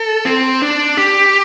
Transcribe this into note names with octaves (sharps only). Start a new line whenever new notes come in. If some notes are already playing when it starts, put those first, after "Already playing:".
Already playing: A4
C4
D4
G4